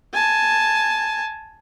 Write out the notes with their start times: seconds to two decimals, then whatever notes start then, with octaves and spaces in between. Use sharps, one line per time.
0.13 G#5 A5